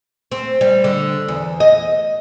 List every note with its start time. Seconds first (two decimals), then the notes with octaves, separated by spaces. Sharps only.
0.32 C4
0.61 G3
0.84 D3
1.28 E2
1.60 D#5